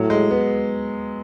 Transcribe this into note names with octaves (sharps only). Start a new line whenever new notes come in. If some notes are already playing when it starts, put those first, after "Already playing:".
Already playing: A2 F#3
G#3
B3